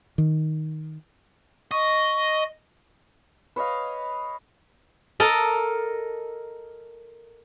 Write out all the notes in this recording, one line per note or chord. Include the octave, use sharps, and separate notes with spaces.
D#3
D#5 C#6
B4 C#5 D#5 F5
A4 A#4 D#5